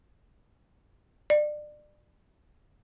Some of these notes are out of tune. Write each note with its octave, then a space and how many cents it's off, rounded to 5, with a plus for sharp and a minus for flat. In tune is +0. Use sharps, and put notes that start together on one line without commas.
D5 +30